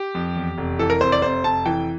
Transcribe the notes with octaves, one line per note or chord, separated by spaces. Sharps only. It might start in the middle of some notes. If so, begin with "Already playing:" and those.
Already playing: G4
F2
E2
F1
E3 A4
A#4
F1 C5
D5
F1 C5
F1 A5
E3 G5